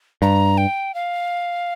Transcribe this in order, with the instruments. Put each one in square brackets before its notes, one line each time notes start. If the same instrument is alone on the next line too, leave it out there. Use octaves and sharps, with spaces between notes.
[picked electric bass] G2 [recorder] A#5
[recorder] G5
F5